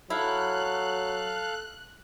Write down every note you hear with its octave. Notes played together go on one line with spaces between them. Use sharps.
F#3 E4 A4 F5 F#6